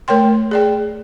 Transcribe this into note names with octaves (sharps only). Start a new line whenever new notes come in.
A3 A#4 C#5 G5 C6
G#4 D5 G5